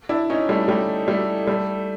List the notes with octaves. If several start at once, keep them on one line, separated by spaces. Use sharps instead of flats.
D4 E4
C#4 D#4
G3 A3
G3 A3
G3 A3
G3 A3